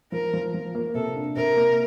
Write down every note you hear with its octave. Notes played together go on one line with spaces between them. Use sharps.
F3 A#4
F3
F3
A#3
C3 A4
D4
C3 A#4
A#3